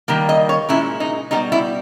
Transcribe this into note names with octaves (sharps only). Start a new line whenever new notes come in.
D#3 G3 A#3
D#5
C#5
A#2 G#3 C#4 E4
D#4
B2 G3 B3 D#4
E4